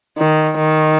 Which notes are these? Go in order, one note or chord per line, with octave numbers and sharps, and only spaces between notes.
D#3
D#3